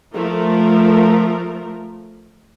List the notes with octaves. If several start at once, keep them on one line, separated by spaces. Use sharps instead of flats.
F3 A3 A#4